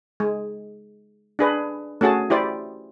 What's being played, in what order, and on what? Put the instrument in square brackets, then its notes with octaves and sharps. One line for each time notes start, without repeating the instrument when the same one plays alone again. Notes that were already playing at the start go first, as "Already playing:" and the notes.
[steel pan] G#3
D4 G#4 B4
A3 C#4 F#4 G#4 A5
E4 G4 C5 D5